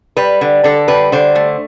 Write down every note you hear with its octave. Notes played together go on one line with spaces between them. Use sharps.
G3 B4
D3
D3 A4
G3 B4
D3 C5
A3